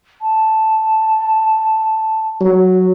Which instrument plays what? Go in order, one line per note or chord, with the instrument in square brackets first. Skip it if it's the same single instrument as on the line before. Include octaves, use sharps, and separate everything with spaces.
[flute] A5
[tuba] F#3